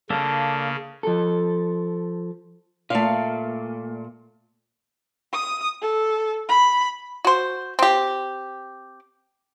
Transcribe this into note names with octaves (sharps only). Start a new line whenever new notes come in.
C#3 A#3 D4 A4
F3 A4
A#2 A3 F5
D#6
A4
B5
F#4 C5
C4 G4